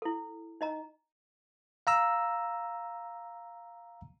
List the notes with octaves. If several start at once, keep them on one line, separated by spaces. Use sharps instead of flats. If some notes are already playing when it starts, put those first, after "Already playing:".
E4 A4
D#4 D#5 A#5
F5 A#5 E6